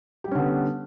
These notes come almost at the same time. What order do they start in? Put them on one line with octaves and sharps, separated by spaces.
G4 G3 C#4 D3 B3